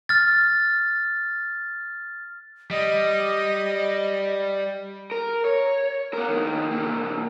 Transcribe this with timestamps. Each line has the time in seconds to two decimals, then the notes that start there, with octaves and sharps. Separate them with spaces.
0.09 F6 A6
2.71 G3 D#5
5.11 A#4
5.45 C#5
6.14 B3 A#4
6.29 F2 D#3
6.71 C2 A#3